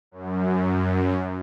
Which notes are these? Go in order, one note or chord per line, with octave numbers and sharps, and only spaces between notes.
F#2